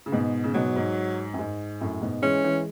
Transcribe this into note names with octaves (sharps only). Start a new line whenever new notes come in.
C#3
G#2 B2
C#3
G#2 B2 F#3
G#2
F#2
G#2
F#2 A2
G#2 B2
E3 G#3 C#4
E3 G#3